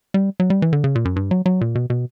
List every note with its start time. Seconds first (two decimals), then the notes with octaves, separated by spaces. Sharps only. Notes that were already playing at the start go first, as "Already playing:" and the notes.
0.14 G3
0.40 F#3
0.50 G3
0.62 E3
0.73 D3
0.84 C#3
0.95 A#2
1.05 F#2
1.16 G2
1.31 F#3
1.46 F#3
1.61 A#2
1.75 B2
1.90 B2